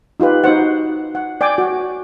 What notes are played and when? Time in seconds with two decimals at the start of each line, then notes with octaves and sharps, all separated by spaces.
0.20 D#4 F4 G4 B4
0.44 D#4 F#4 C5 F#5
1.15 F#5
1.41 D5 G5 G#5 D6
1.58 F#4